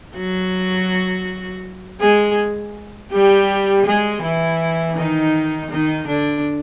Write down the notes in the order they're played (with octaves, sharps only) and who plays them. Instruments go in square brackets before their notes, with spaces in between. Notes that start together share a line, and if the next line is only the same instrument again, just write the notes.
[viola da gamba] F#3 F#4
G#3 G#4
G3 G4
G#3 G#4
E3 E4
D#3 D#4
D#3 D#4
D3 D4